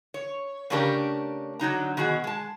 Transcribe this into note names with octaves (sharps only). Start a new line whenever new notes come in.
C#5
C#3 A3 C#4 D4 G4 A#4
D3 F#3 D#4 A#5
B2 D#3 F#4 G#4
G#3 A5